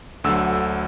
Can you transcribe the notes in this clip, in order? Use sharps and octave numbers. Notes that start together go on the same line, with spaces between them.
D2 D3 F#3 E6